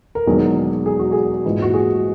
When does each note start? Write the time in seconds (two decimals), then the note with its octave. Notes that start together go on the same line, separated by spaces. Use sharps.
0.15 A#4
0.27 E1 E2 D#3 F#3 A#3 G#4
0.86 G#4
0.99 F#4
1.12 G#4
1.45 A#1 G#2 E3
1.62 F#4
1.74 G#4